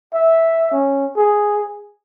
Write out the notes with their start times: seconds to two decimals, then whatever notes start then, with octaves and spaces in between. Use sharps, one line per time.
0.13 E5
0.72 C#4
1.17 G#4